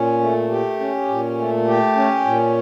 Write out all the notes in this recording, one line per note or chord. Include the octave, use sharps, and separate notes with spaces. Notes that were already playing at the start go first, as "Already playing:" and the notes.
Already playing: A#2 C#4
A3
G4
C#4
A#2
A3
G4
C#4
A#2